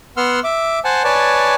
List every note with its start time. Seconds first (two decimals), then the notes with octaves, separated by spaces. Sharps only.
0.17 B3 F#5 C6 E6 F6
0.44 E5 D6
0.85 C5 F#5 G#5 A5
1.04 B4 C#5 D5 G#5 A5